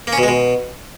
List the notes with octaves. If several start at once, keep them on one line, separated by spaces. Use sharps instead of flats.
A#3
C#4
B2
G#3
B2